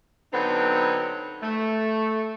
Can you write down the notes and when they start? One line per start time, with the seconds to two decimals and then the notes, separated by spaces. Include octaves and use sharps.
0.33 D3 F#3 B3 C4 D#4 A4
1.43 A3